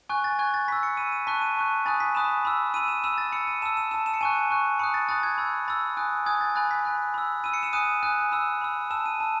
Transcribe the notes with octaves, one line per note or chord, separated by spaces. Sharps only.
G#5 C#6 F#6
A6
G#5 C#6 F#6 G#6
A6
B5 E6 B6
C#7
B5 E6 D#7
D#7
A5 C#6 F#6 B6
D#7
A5 C#6 F#6
G#5 B5 D#6 F#6 A6
B6
G#5 B5 D#6 F#6 E7
B5 E6
B5 E6 D#7
E7
B5 E6 E7
A6
B5 E6 C#7
D#7
A5 E6 E7
E7
A5 E6 E7
E7
C#7
G#5 C#6 F#6 D#7
G#5 C#6 F#6
B5 D#6 F#6 C#7
A6
B5 D#6 F#6 A6
G#6
B5 E6
B5 E6 A6
G#5 D#6 F#6
G#5 D#6 F#6 G#6
A6
G#5 B5 F#6 A6
B6
G#5 B5 F#6
B5 E6
B5 E6 D#7
C#7
E7
G#5 D#6 F#6 D#7
G#5 D#6 F#6
B5 E6 E7
B5 E6
A5 E6 E7
D#7
A5 E6